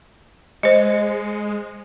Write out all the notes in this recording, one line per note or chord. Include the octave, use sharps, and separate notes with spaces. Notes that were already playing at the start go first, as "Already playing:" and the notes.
G#3 C5 D#5